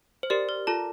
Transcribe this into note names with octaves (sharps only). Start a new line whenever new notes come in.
C5
G4 A#4 D5
A#4
F4 A4 A5